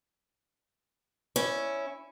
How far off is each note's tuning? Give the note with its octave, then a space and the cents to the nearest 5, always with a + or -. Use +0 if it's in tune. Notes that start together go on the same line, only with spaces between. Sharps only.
C#4 +0 E4 +0